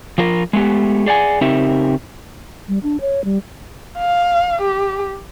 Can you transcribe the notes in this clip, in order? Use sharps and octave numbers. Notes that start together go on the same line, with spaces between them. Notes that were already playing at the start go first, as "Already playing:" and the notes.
F3 F4 A#4
G#3 A3 B3 G4
G#4 D5 F#5 G#5
C#3 C4 D#4 G4 A#4 E5
G3
D4
C#5
G3
F5
G4